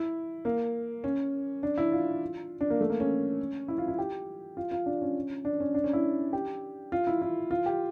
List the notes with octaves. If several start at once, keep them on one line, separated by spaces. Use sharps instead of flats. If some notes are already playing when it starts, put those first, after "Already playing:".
Already playing: E4
A#3
C#4
D4
E4
F4
D4
A#3
A3
A#3
C#4
E4
F4
E4
G4
F4
F4
D4
C#4
D4
C#4
D4
C#4
E4
G4
F4
E4
E4
F4
G4